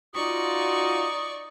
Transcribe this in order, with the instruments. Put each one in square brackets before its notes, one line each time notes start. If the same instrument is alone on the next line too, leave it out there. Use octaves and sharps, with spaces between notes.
[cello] D#4 [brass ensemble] F4 F#4 [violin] D5 C#6 [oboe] D#6